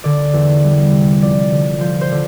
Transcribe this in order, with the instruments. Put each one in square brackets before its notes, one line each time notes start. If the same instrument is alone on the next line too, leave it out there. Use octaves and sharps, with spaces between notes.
[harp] D3 D5
E2
G3
C3
F3 D5
D3
F3 C5
C5
D3